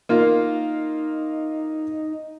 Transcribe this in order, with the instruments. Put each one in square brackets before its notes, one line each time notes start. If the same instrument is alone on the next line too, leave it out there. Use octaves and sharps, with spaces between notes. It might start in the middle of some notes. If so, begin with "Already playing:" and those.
[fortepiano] A#3 F4 [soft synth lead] D#4